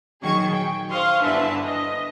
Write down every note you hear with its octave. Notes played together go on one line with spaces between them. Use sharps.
A#1 D#3 F#3 G#4 C#6 G#6
G5
C5 F5 C6 C#6 D#6
G1 D3 E3 B4 E5 A5
D#5